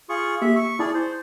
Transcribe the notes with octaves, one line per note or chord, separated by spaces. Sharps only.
F4 G#4 C#6
A#3 G4 E5
C#6
E4 G#4 D5 A5
C5